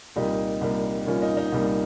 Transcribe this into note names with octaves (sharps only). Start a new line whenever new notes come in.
C2 A#2 G3 A#3 D#4 G4
C2 A#2 G3 A#3
C2 A#2 G3 A#3 C#4 F4
D#4
D#4
C2 A#2 G3 A#3